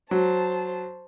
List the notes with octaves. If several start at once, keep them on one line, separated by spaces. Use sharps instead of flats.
F#3 C5 A5